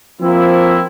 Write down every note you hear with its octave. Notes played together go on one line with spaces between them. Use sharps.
F3 A#3 C4 E4